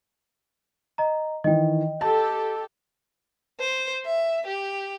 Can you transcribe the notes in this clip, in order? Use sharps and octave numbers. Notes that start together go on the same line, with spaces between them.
D#5 A#5
D#3 E3 D#5 G5
G4 A4 A5
C5
E5
G4